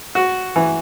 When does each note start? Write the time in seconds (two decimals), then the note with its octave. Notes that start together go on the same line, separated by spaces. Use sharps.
0.15 F#4
0.56 E3